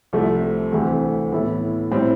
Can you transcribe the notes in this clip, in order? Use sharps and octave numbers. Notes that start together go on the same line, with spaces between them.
C2 C3 F3 A3
D2 C3 E3 A3 C4
A2 E3 B3 E4 A4
A2 G3 C4